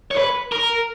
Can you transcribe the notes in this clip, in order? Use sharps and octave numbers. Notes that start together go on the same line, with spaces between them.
C#5
B4
A#4